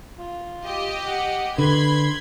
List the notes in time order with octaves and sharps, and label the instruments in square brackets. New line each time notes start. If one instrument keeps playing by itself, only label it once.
[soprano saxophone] F4
[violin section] G4 D#5
[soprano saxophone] F#5
[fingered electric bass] D3 [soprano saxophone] B4 [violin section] B5 C6 G#6